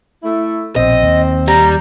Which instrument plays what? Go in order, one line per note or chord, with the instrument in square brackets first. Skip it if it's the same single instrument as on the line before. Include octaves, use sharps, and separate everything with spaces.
[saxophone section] A3 E4
[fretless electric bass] A#1 B2 [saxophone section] C4 [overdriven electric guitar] D#5
[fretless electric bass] D#2
[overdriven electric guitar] G3 [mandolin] A#5